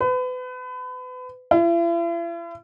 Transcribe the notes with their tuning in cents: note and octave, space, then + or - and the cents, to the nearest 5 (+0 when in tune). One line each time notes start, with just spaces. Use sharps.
B4 +35
E4 +45